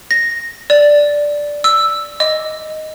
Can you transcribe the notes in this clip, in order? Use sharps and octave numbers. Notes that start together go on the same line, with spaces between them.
A#6
D5
E6
D#5